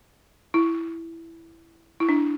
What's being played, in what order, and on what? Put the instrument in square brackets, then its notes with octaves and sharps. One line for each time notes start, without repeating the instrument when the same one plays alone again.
[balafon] E4
E4
D4